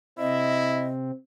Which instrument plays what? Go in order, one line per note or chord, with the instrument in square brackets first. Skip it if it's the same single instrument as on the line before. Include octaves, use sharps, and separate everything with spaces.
[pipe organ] C3 C4 [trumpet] E4 [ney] D#5